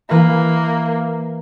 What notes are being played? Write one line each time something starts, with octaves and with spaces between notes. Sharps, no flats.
E3 A#3 B4 F#6